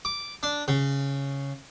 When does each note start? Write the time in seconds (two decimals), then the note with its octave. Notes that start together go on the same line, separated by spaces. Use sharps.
0.05 D6
0.43 D4
0.68 C#3